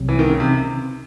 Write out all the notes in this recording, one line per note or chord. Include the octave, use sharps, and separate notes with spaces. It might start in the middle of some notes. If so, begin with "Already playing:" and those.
Already playing: C2 C3 F#3 C4
E3
D#3
C#3
C3